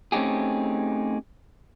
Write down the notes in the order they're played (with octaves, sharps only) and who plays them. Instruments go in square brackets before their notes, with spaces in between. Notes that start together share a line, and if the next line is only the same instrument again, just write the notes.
[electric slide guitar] A3 C4 C#4 D#4 G4 G#4